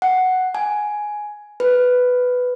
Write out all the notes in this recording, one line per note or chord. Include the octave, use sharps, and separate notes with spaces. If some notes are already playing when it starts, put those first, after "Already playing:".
F#5
G#5
B4